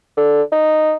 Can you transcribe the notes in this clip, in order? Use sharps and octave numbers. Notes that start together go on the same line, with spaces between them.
D3
D#4